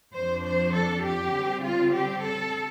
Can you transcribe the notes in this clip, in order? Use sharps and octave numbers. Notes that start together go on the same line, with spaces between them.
F2 F3 D4 C5
C5
A4
G4
D3 G3 C4
F4
G4
A4